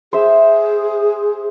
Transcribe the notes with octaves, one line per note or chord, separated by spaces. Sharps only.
G#4 C5 E5